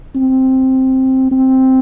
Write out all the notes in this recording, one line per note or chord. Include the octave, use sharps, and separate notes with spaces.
C4
C4